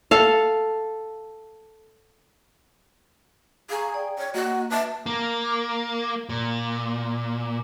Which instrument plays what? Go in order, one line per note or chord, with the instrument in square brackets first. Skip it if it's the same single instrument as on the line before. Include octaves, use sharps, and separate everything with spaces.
[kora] A4 F5
[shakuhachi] G#4 [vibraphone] F5 A#5 C#6
[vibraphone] D5 G5
[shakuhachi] C#5
[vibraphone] A#3 D#5 [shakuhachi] F#4
[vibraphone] B4 E5 [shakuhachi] A5
[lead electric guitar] A#3
A#2